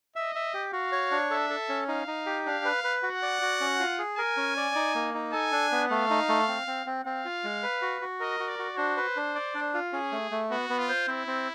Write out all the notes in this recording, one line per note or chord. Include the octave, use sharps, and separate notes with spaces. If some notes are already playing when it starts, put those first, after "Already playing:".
D#5 E5
E5
G4
F#4 F5
C#5
D4
A4 E5
A4
C#4
D#4 F5
D#4
G4
D4 F5
B4
B4
F#4 F#5
D5
F#4
C#4
F4
G#4
A#4 G#5
C#4
D5
D#4
A#3
D#4
A4 G#5
D4
B3
A3 F5
D#4
A3
C4
C4
C4
C4 F5
F4
G#3
B4
F#4
F#4
A#4 D#5
F#4
D5
F#4
D4 C5
B4
D4
D5
D4
F4
C#4 G#4
A3
A3
B3 F#4
B3
F4
C5
C4 E4
C4